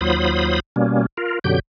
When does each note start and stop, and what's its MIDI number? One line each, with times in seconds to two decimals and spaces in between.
0.01 0.60 39
0.01 0.60 54
0.01 0.60 65
0.01 0.60 72
0.01 0.60 83
0.01 0.60 87
0.76 1.06 47
0.76 1.06 55
0.76 1.06 58
0.76 1.06 61
1.17 1.39 65
1.17 1.39 70
1.44 1.59 42
1.44 1.59 47
1.44 1.59 50
1.44 1.59 54
1.44 1.59 67
1.44 1.59 91